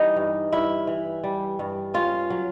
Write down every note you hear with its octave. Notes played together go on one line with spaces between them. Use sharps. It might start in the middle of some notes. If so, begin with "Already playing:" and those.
Already playing: E3 G3 D#4
G2
G2 E4
E3
G3
G2
C#4 F4
F#3